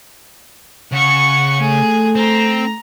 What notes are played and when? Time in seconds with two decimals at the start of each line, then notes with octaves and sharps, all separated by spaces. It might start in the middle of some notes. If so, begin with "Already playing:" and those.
0.92 C#3 F#5 C#6
1.60 A3 G#4
2.16 C4 A#5